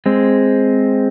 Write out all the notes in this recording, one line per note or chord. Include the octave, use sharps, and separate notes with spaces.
G#3 C4